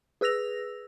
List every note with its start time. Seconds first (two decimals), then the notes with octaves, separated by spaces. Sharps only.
0.21 G#4 B4 E6 A#6 F7